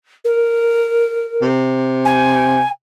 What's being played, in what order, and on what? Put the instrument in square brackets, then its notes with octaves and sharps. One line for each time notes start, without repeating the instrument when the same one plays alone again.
[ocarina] A#4
[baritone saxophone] C3
[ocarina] G#5